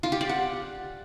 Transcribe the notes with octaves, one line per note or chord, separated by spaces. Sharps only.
F4
G4
D5
F#5